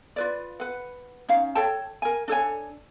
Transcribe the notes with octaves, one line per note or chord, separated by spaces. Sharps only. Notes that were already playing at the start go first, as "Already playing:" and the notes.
F4 B4 D5
B4 F#5
C#4 D#4 F5
A4 C#5 G5 A5
A#4 G#5
D4 A4 C#5 G#5